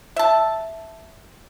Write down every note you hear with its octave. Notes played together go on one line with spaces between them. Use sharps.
E5 A5